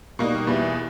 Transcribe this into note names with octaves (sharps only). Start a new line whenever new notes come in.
B2 G3 A#3 D#4
E2 B2 E3 G3